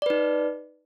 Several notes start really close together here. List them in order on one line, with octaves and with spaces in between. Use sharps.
D5 B4 D#4